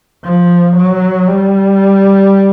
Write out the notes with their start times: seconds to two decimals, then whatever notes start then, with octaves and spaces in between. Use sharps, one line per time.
0.25 F3
0.76 F#3
1.28 G3